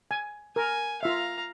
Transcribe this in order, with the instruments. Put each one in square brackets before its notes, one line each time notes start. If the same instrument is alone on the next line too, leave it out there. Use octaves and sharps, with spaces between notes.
[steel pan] G#5
[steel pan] A#4 [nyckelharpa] G#5
[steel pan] F4 E5 [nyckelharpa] F5 A#5